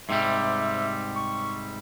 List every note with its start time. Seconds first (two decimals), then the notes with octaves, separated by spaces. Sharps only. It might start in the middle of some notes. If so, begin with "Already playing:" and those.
0.09 G#2 C3 G3 E5
1.16 C#6